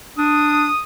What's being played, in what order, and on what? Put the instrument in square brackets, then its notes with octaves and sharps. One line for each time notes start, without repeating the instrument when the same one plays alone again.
[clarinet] D4 [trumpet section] D#6